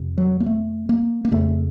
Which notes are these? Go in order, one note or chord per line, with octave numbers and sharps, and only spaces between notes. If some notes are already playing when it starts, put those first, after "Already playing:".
Already playing: F2 C3
F#3
A#3
A3
A#3
A#3
F2 C#3 A3